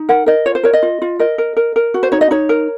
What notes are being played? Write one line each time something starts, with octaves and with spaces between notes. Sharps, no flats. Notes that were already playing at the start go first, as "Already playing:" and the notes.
Already playing: D#4
A#4 F#5
A#4 D#5
F4 C#5
C5
A#4 C#5
D#5
F4
F4
A#4 D#5
A#4
A#4
A#4
F#4
C5
D#4 C#5
D#5
D#4 C#5
A#4